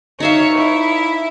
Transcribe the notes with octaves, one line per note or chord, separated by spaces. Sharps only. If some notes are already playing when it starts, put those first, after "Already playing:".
D#4 C#5 E5 F5
E4